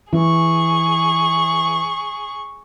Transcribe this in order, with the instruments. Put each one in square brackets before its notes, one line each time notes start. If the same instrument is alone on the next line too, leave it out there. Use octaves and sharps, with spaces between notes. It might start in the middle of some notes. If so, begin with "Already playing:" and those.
[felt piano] E3 [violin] G#4 C#6